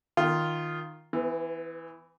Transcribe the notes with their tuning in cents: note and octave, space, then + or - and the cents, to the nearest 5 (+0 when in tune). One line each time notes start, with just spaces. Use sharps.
D#3 +0 F4 +0
E3 +0 B3 +45